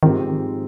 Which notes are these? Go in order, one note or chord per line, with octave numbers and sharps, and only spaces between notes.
G#2 D#3 F3 G#3 C4 G4